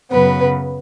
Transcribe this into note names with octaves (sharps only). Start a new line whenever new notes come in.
F#2 C#3 F#3 B3 B4